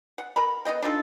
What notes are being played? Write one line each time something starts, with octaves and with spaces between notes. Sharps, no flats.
F#5
A#4 A#5 B5
B3 D#4 D#5 G5
D4 D#4 F4 A4